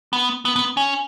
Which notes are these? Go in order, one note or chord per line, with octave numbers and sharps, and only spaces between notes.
B3
B3
B3
C#4